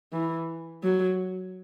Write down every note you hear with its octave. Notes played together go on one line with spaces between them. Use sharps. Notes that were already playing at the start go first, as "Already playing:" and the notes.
E3
F#3